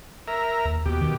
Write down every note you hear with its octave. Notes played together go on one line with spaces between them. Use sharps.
A#4 E5 A#5
D#2
D#2 B2 G4
D#3